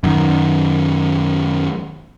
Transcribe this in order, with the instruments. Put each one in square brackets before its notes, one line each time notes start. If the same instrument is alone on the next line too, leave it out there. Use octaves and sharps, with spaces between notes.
[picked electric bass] F#2 D#3